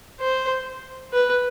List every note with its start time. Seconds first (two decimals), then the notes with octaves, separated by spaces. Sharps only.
0.20 C5
1.13 B4